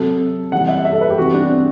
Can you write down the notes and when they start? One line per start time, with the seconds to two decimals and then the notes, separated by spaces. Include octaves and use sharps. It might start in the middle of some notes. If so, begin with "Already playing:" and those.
Already playing: C3 F#3 A4
0.52 C3 E3 G3 F#5
0.69 E5
0.85 E5
0.93 A4
1.01 B4
1.10 G4
1.17 C3 E3 G3 F#4
1.34 D4
1.50 C4